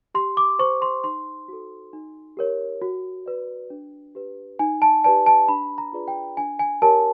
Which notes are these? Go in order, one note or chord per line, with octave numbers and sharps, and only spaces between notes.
G4 C6
D6
C5 C#6
C6
D#4 C6
F#4 A4
D#4
G4 A#4 C#5
F#4
B4 D5
D4
G4 B4
D#4 G#5
A5
G4 B4 D5 A5
A5
D4 B5
A#5
F4 G#4 B4 D5
G5
D4 G#5
G#5
G4 A#4 C#5 A5